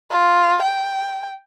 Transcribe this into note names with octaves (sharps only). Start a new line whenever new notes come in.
F4
G5